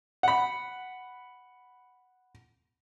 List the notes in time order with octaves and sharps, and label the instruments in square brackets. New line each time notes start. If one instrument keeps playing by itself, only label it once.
[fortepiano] F#5 B5